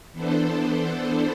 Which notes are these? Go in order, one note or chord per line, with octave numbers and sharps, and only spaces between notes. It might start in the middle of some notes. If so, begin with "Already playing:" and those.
E3 B3 D4 A4 C5